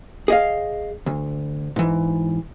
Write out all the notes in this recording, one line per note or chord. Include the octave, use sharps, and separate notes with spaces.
G#4 D#5 F5
D2
G#2 E3